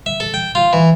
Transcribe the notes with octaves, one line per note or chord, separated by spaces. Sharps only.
E5
A4
G5
F4
E3